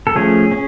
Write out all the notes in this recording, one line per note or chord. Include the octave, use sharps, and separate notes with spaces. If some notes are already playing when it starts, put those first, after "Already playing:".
A4
F3 A3 C#4 G#4
C#4